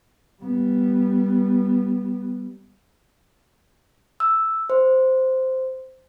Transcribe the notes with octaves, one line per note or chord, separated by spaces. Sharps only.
G3 B3
E6
C5